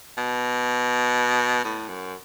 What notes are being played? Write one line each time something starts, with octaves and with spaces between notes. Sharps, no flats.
B2
A2
F#2